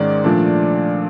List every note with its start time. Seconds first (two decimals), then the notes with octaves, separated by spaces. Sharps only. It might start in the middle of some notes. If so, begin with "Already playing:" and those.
Already playing: G#2 D#3 G#3 C#4 D5
0.24 A#2 F3 A3 D4